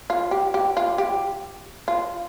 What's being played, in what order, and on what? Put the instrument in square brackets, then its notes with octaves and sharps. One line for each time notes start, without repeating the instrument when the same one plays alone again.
[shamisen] F4
G4
G4
F4
G4
F4